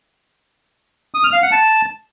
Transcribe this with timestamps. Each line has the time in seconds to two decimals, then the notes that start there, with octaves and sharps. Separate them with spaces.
1.14 D#6
1.24 F6
1.33 F5
1.42 F#5
1.52 A5